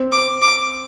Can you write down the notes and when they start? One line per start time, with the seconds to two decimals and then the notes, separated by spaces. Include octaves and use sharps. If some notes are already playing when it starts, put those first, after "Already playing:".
Already playing: C4
0.12 D6
0.42 D6